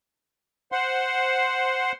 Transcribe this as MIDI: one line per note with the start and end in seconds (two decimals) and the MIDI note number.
0.72 1.92 72
0.72 1.92 78
0.72 1.92 84